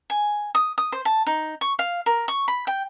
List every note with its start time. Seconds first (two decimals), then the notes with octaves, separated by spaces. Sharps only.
0.10 G#5
0.55 D#6
0.78 D#6
0.92 C5
1.05 A5
1.27 D#4
1.61 C#6
1.79 F5
2.06 A#4
2.28 C#6
2.48 B5
2.67 G5